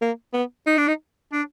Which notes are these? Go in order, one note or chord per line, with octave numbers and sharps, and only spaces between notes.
A#3
B3
D#4
D4
D#4
D4